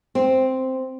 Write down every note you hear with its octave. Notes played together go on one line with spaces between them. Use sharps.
C4